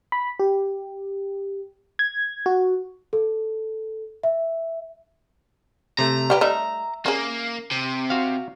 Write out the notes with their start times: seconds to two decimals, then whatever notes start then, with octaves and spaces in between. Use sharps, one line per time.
0.12 B5
0.40 G4
1.99 G#6
2.46 F#4
3.13 A4
4.23 E5
5.99 C3 A3 A#5
6.30 G3 G4 B4
6.41 G3 A3 D#4 E5
7.06 A#3 C#4 G#4
7.71 C3
8.10 F#4 F5